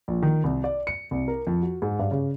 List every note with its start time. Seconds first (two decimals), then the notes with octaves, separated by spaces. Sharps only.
0.08 A#1
0.22 D#3
0.44 C2
0.64 D5
0.87 C#7
1.11 C2
1.28 A#4
1.47 F2
1.62 F#4
1.82 G#2
1.99 G2
2.11 C#3